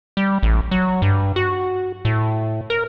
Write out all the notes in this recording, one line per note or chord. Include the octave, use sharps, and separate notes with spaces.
G3
A1
F#3
G2
F#4
A2
A#4